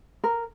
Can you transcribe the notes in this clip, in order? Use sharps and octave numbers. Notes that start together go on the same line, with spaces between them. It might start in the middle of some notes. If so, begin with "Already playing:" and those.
A#4